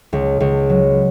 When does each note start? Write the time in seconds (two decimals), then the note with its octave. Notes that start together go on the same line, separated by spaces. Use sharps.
0.13 C#2
0.40 C#2
0.70 F#3